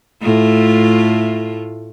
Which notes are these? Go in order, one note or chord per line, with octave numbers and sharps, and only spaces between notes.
A2 A3 F4